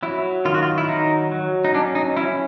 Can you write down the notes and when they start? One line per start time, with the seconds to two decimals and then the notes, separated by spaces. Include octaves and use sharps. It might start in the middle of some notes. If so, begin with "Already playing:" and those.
0.03 F#3 E4
0.45 D#3 F4
0.54 F#4
0.63 F4
0.78 E4
0.89 F#3 D#4
1.32 F#3
1.65 D#4
1.74 C#4 D4
1.95 D#4
2.17 C#4 E4